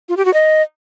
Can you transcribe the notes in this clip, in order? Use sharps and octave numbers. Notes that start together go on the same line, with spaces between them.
F4
G4
F#4
D#5